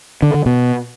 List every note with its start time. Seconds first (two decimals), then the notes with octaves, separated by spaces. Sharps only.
0.22 D3
0.34 D3
0.46 B2